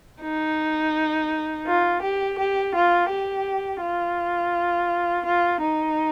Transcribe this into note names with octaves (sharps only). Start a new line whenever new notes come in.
D#4
F4
G4
G4
F4
G4
F4
F4
D#4